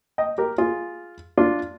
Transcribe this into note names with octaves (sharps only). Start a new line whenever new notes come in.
D#5 G5
G4 A#4
F4 G#4
D4 F4